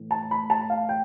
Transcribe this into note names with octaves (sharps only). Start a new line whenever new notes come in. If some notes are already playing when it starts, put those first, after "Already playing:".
Already playing: A2 E3
A5
B5
A5
F5
G5